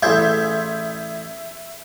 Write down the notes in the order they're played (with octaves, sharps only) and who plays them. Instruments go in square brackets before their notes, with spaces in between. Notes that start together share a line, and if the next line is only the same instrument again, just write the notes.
[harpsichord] A1 G#4 D5 [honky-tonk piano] E5 G6 G#6